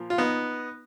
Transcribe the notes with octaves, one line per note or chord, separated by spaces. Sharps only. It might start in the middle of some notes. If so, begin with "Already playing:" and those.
Already playing: A#2 F3
F4
B3 D#4